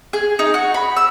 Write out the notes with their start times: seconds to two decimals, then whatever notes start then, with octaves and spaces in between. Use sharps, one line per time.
0.13 G#4
0.39 D#4
0.54 F#4
0.74 B5
0.97 E6